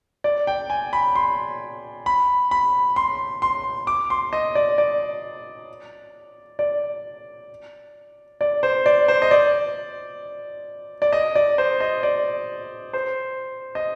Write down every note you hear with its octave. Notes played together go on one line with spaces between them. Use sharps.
D5
G5
G#5
B5
C6
B5
B5
C6
C6
D6
C6
D#5
D5
D5
D5
D5
C5
D5
C5
D#5
D5
D5
D#5
D5
C5
D#5
D5
C5
D#5